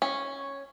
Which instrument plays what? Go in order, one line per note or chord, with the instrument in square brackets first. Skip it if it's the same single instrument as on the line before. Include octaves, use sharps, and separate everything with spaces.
[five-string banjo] C#4